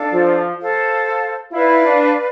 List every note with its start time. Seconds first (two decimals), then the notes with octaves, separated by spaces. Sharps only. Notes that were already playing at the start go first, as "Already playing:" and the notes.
Already playing: D4 A4 D5 F5
0.13 F3
0.60 A4 C5 F5
1.53 E4 B4 D5 F5
1.85 D4